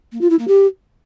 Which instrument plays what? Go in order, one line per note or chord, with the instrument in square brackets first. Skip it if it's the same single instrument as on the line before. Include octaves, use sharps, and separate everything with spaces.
[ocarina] A#3
F4
E4
A#3
G4